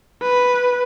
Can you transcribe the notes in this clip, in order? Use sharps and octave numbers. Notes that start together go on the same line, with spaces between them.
B4